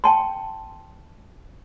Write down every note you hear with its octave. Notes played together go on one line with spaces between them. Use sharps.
G5 A5 C6